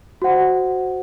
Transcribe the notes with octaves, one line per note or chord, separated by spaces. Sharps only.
F#4 C5 F#5